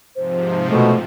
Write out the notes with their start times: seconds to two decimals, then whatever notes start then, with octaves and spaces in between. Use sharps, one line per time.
0.16 G#2 C3 F3 C5
0.70 B2 A3